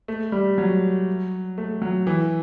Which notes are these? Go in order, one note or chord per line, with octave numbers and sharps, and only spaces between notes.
A3
G3
F#3
A3
F#3
E3